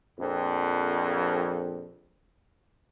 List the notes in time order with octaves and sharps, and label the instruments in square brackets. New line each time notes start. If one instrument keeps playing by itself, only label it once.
[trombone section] A#1 F2